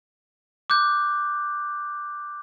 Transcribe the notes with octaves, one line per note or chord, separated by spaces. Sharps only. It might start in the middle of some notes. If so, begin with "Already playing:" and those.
D6 F#6 G6